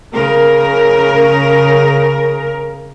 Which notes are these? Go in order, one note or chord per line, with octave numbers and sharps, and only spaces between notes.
C#3 A#4